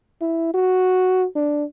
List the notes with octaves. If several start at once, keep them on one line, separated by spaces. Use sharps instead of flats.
E4
F#4
D4